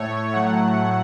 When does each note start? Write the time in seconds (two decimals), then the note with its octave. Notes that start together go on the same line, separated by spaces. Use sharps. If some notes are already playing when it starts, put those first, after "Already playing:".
Already playing: A2 A3 C#5
0.32 A2 F#3 A3 F#5